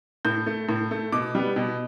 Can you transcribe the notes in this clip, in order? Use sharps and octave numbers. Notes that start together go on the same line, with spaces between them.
A2 G6
A3
A2
A3
B2 D6
G3 B3
B2